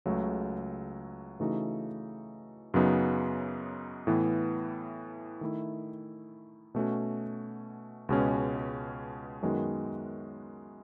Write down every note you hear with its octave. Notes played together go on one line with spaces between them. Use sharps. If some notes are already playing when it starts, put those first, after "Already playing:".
C#2 C#3 F#3 A3
C#3 E3 A3 D#4 F#4
F#2 C#3 F#3 B3 D#4
A2 E3 B3
D#3 A3 E4
B2 A3 C#4 F#4
C#2 B2 G#3 C#4
F#2 D#3 G#3 B3 F#4